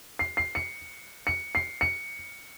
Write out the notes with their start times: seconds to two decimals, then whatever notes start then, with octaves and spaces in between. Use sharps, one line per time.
0.19 C7
0.37 C7
0.55 C#7
1.27 C#7
1.55 C7
1.81 C#7